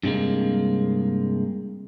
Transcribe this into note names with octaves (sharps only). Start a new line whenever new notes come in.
G2 C3 G#3 A#3